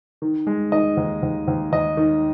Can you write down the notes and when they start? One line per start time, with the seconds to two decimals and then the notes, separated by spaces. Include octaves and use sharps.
0.22 D#3
0.47 G#3
0.72 D#3 D#5
0.97 D#2
1.22 D#2
1.48 D#2
1.72 D#2 D#5
1.97 D#3